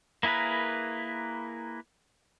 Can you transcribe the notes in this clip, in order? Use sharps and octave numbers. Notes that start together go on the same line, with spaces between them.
A#3 E4 G#4 A#4 B4